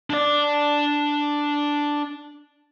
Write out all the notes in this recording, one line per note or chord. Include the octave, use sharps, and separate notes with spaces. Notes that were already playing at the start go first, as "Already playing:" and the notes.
D4 D5